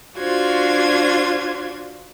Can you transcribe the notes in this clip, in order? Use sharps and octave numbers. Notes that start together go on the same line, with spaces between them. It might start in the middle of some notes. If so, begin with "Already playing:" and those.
D4 F4 F#4 C5 G#6